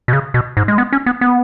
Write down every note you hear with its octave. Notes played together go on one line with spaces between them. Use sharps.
B2
C#3
B2
G#2
G#3
B3
C#4
B3
B3